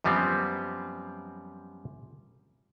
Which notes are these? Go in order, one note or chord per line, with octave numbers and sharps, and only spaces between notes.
F#2 F3 G3 B3 C4